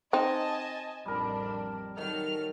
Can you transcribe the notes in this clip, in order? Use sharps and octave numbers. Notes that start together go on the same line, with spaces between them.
C4 D#4 D#5 G#5 A5
A1 F2 G3 D4 A#4
D#3 F#3 A4 F6